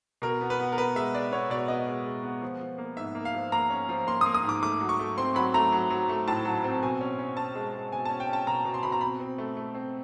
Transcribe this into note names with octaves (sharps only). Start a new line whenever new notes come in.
B2 A#4
B3
B4
B3
A#4
B3 B4
G#3 E5
G#3 D5
B3 C#5
B2 D5
B3 D#5
G#3
G#3
B3
F3
F3
A#3
G#2 E5
A#3
F5
F3
A#3 A#5
C#4
F3
A#3 C6
D#6
A#3
D#6
G#2 D6
A3 D6
F#3
C#6
A3
C4 C6
F#3 B5
A3 A#5
F#3
F#3
A3
A2 A5
F#3
C4
B2 G#5
C#4
C#4
C#4 A5
G#3
G#3
B2 G#5
A5
C#4
G5
C#4 A5
B2 A#5
B2
C6
B2 B5
A#5
C4 B5
C4
A3
A3
C4